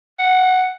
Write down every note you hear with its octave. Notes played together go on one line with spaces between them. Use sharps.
F#5